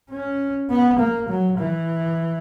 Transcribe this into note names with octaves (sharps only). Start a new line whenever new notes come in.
C#4
B3
A#3
F#3
E3